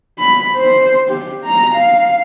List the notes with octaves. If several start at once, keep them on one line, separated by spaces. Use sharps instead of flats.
B5
C5
G4
A#5
F5